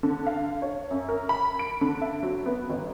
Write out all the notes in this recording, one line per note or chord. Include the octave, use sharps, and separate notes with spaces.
D3
F5
C#5
F#2
A#4
B5
D7
D3
E5
F#3
B3
G1